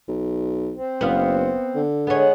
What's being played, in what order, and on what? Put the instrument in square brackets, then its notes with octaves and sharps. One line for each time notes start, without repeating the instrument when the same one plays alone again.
[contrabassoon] B1
[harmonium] C4
[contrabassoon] F#1 [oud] B3 F5
[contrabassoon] D3
[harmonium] G#3 G#4 F#5 [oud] B3 C#5